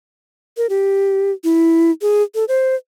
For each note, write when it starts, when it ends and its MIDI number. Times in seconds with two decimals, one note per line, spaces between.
0.57 0.67 70
0.70 1.31 67
1.44 1.91 64
2.02 2.23 68
2.35 2.45 69
2.48 2.75 72